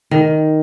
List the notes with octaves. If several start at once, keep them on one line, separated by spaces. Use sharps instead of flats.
D#3